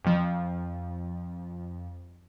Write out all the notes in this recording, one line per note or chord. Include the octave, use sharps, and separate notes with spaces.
F2 F3